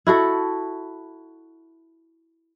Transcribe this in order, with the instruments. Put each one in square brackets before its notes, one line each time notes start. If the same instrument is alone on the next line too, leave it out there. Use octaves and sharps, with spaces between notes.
[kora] E4 F#4 A4